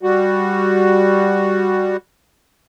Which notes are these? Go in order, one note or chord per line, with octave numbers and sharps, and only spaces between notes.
G3 F#4